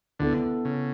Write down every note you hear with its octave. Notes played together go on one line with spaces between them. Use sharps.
D2 D3 B3 E4 A4
C#3